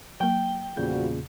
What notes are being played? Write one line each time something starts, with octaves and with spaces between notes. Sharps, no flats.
F#3 A#3 G5
E2 A#2 C#3 F3 G3 F#4 G6